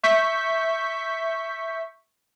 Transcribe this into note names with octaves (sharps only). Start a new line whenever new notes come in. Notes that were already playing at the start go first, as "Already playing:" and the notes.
E5 C#6 G6 B6